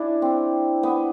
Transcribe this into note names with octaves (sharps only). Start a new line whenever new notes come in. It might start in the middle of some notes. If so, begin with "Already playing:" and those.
Already playing: D4 E4
C4
B3